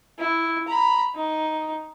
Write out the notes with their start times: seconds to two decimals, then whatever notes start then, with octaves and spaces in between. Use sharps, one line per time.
0.18 E4
0.68 A#5 B5
1.16 D#4